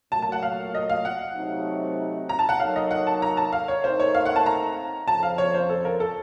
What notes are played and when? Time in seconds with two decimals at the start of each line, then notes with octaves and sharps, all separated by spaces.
0.12 A#2 F#3 A3 A5
0.22 A5
0.32 F#5
0.43 F5
0.75 D#5
0.90 F5
1.05 F#5
1.36 C3 F#3 A3 C4 D#4
2.29 A#5
2.39 A5
2.49 F#5
2.60 F#3 A#3 D#4 A4 C#5 F5
2.76 D#5
2.91 F#5
3.07 A5
3.22 A#5
3.37 A5
3.53 F5
3.68 C#5
3.84 A3 C4 D#4 A#4 C5
4.00 C#5
4.15 F5
4.26 F#5
4.36 A5
4.46 A#5
5.08 F2 C#3 F3 A5
5.23 F5
5.38 C#5
5.54 C5
5.69 A4
5.85 A#4
6.00 A4